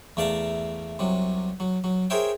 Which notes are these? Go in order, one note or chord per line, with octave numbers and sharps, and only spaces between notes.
E2 A3 D5 E5 F5 A#5
C2 C3 F#3
F#3
F#3
G#4 A#4 C5 C#5 E5 G5